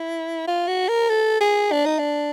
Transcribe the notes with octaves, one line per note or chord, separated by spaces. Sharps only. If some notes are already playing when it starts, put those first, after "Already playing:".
Already playing: E4
F4
F#4
A#4
A4
G#4
D4
D#4
D4